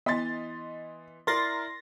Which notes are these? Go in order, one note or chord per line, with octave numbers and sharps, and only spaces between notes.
E3 B3 D#5 C6 A6 B6
E4 A#4 D5 C6 A6 A#6